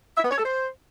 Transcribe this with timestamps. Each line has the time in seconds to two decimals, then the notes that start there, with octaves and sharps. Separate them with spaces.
0.17 E5
0.24 B3
0.31 C#5
0.38 A4
0.45 C5